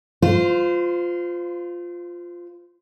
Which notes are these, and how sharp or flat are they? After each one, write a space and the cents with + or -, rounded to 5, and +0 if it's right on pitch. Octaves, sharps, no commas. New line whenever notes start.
F4 +0 C5 -30